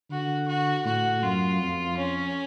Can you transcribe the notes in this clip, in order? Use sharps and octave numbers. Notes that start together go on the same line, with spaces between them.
D3 F#4
F#4
A2 F#4
F#2 F4
F2
C#4